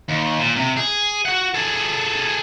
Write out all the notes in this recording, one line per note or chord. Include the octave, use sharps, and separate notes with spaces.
D#2
A#2
C3
G#4
F#4 F#5
G#4 A4